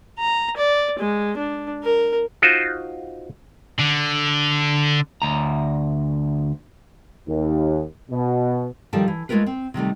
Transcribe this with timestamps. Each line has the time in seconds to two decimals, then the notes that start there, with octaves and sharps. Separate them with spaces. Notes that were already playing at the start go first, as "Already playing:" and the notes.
0.19 A#5
0.57 D5
0.99 G#3
1.37 D4
1.83 A#4
2.42 D#4 F4 F#4 C5
3.79 D3
5.22 D2 A#5
7.28 D#2
8.10 B2
8.93 D#3 F3 G3 A4 A5
9.08 E3
9.29 G#3 A3 D#4 F4 A#4 B4
9.46 C4
9.74 C3 D#3 G3 A3